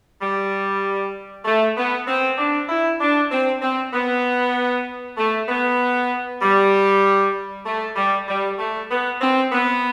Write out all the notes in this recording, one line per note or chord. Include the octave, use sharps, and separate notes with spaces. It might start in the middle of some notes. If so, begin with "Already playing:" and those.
G3
A3
B3
C4
D4
E4
D4
C4
C4
B3
A3
B3
G3
A3
G3
G3
A3
B3
C4
B3